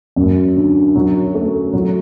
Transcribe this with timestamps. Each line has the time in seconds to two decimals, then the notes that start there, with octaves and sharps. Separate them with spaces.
0.16 F#2
0.55 D3
0.95 F#3
1.34 A3
1.73 F#3